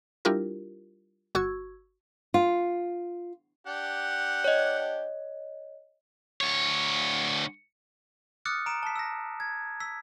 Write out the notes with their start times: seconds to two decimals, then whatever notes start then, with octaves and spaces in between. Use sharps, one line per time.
0.25 G3 D4 E4 F4 G4 A#4
1.35 G1 F#4 C#6 E6 G#6
2.34 F4
3.67 D4 G4 F#5
4.44 C#5 D#5
6.41 D2 C#5
8.45 D6 D#6 F6 F#6 A6 C#7
8.66 A#5 D7 E7
8.83 A5 B6
8.96 E6 A#6
9.40 G#6
9.80 E6 B6